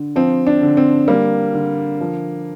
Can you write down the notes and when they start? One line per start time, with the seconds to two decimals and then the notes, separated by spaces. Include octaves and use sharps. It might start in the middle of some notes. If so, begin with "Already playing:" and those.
Already playing: D3
0.16 F3 C4
0.47 D4
0.62 D3
0.77 C4
1.08 G3 A#3
1.54 D3
2.01 F3